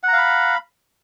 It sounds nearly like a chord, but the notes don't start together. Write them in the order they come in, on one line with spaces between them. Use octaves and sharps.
F#5 A#5 F5 B5